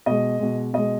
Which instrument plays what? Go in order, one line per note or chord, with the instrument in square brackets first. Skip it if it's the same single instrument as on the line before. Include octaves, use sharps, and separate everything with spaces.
[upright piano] B2 G#3 D#5
B2 G#3
B2 G#3 D#5